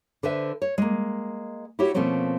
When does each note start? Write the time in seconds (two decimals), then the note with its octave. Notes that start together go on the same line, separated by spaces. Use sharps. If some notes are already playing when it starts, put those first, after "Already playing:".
0.23 D3 B4 C5 E5
0.62 C#5
0.78 G#3 A#3
1.79 E4 F#4 G4 C#5
1.94 B2 F3 A3 A#3 C4 C#4